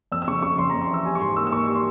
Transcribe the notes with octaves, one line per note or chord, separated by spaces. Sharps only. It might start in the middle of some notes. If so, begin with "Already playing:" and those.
F2 E6
E6
C#3 C#6
C#3 C#6
F2 C6
F2 A#5
C6
E3 E6
G3 G#5
C#6
G#2 C6
A#3 E6
E6
A#3 C#6
G3
C6